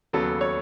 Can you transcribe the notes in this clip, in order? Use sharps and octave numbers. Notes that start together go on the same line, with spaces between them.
D#2 C#3 F#3 B3 A4
C#5